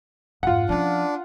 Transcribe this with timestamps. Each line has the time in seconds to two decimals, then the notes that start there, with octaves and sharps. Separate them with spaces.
0.43 F2 G#2 F4 F#5
0.69 F3 C#4 D4